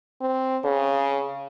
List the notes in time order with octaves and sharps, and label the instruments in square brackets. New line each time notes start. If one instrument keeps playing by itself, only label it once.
[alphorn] C4
C#3